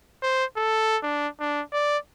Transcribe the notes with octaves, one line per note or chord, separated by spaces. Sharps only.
C5
A4
D4
D4
D5